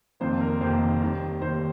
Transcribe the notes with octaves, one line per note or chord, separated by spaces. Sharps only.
F1 F2 C3 D#3 A#3 C5
A#4
F1 F2 C3 D#3 A#3 C5
D#2 D#3 G3
D#2 D#3 G3 C5